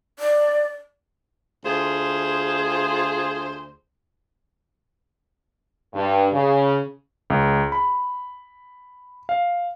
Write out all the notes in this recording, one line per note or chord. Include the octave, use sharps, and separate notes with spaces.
D5
D2 F4 G#4 C5
G2
C#3
C#2
B5
F5